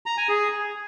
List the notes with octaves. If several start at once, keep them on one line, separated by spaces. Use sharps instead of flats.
A#5
G#5
G#4